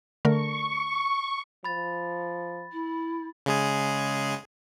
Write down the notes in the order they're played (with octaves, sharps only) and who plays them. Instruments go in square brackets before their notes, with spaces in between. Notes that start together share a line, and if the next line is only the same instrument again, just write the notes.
[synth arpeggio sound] D3 A3 A#4 [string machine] C#6
[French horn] F3 [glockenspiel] B5 A6
[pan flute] E4
[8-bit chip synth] C#3 G#3 G#4